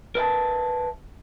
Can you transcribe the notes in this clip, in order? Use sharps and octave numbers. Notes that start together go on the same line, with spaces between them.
A#4 B4 E5 A5